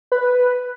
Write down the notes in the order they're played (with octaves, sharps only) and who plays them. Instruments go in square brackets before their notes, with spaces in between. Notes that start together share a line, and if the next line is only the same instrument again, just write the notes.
[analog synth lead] B4